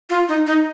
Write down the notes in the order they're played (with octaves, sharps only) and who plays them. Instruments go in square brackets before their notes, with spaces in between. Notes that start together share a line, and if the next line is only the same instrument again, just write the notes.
[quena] F4
D#4
D#4